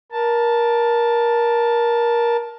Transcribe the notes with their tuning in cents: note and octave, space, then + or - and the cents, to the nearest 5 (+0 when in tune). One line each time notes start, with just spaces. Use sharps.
A#4 +20 A5 +0